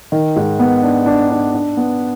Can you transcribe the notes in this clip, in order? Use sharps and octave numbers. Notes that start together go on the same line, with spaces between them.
D#3
G#2
B3
D4
D4
D4
D4
B3